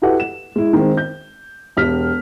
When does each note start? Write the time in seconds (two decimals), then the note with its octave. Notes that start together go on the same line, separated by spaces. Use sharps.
0.02 E4 F#4 G4 A4 B4 F#5
0.20 E7
0.56 G#3 E4
0.73 D#3 G#3 C4
0.97 G6
1.77 E1 G4 F6 B6